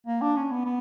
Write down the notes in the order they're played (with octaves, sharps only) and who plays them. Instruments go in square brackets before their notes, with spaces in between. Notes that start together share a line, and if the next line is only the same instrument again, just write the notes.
[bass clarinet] A#3
D4
C#4
B3
B3